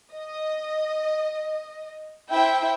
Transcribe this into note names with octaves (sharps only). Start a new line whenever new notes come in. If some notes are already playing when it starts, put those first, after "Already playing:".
D#5
E4 C5 E5 G5